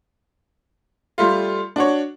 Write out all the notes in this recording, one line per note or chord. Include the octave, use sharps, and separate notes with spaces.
G3 A3 F4
D4 F#4 C#5